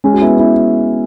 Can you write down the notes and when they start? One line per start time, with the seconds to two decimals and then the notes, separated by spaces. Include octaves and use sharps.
0.04 G#3 C#4
0.13 F#4
0.22 B3 E4
0.39 B3 E4